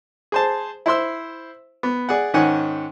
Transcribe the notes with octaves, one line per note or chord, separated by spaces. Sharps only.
G#4 C5 A5
E4 C5 C6 E6
B3
G#4 D5 F#5
G#2 D#3 C#4 F#5 G#5